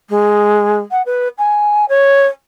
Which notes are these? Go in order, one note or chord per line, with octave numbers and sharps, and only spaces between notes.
G#3
F#5
B4
G#5
C#5